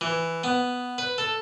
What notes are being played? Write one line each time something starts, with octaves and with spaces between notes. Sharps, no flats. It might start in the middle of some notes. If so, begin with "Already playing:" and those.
E3
B3
B4
A4